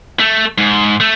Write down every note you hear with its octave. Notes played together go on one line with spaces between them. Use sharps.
A3
G#2
A3